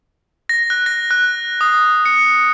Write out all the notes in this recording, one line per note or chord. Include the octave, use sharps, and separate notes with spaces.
A#6
F#6
A#6
F#6
D#6
C#7